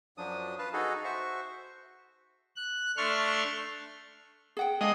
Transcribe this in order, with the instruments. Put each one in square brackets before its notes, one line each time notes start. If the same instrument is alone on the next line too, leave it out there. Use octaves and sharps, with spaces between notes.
[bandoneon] F#2 F3 F#3 D4 D#6
B4 F5 A5
D#4 F#4 G#4 A4
F#4 C5 E5 C#6
[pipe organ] F#6
A3 D4 C6 C#6 F6
[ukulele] G#4 F#5 G5
[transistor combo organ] G#3 D#5 [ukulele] D4 F5 A5